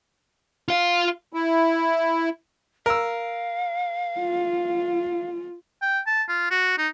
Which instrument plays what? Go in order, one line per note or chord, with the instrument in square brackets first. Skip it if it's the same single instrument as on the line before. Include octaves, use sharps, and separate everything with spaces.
[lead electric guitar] F4 F5
[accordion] E4
[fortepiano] A#4 E6 [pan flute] F5
[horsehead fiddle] F4
[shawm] G5
A5
F4
F#4
D#4